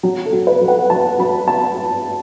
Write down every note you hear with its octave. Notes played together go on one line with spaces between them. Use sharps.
F#3
A4
F#3
B4
F#3
F#5
F#3 A5
F#3 B5
A5